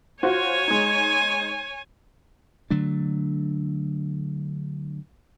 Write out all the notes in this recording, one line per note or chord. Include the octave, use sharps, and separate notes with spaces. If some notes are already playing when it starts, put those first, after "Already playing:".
F4 F#4 C5 C#5 G#5
G#3 D#4
D3 F#3 A3 D4